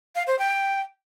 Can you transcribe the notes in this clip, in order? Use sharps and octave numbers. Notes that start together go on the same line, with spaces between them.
F5
C5
G5